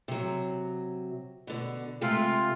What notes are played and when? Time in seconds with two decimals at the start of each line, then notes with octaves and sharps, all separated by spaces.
0.08 C3 F#3
1.47 B2 D3
2.01 C3 G#3 A3 F4